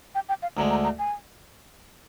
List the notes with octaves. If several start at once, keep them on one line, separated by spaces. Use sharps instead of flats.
G5
G5
F5
D2 D3 G#3 A#5
A#5
A#5
G#5